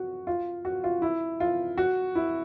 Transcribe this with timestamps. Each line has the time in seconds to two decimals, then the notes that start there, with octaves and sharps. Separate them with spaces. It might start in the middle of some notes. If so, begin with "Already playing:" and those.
Already playing: F#4
0.27 F4
0.65 F#4
0.84 F4
1.02 E4
1.40 F4
1.78 F#4
2.15 E4